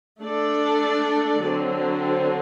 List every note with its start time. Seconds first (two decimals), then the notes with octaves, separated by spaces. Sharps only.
0.21 A3 D4 A4 D5
1.43 D3 F#3 C4